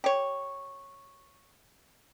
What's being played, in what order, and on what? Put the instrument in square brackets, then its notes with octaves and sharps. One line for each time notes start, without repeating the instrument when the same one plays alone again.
[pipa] G4 C#5